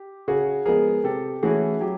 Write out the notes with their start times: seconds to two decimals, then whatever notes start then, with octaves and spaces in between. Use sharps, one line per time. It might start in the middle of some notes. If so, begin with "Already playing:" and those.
Already playing: G4
0.28 C#3 F#4 G#4
0.65 F3 G#3 B3 G#4 A#4
1.04 C3 G4 A4
1.43 E3 A3 C#4 E4 F#4 G#4
1.81 F#3 G4